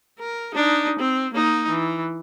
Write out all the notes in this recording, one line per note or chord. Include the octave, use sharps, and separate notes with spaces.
A#4
D4 D#4
C4
A#3 D#4
E3